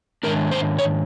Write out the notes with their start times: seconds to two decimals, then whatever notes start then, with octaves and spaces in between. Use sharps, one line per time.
0.23 G#2 D#3 G#3 D4 A#4
0.51 C5
0.79 C#5